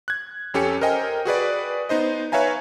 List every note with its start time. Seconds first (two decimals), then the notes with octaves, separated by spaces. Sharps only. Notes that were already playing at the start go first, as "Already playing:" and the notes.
0.08 F#6 G#6
0.54 F2 C#4 G4 A4 G#5 C#7
0.81 A#4 C5 D#5 G5 G#5
1.25 F#4 G#4 B4 D5
1.89 B3 D#4 C5 D#5
2.32 B4 C#5 E5 F5 G#5 A#5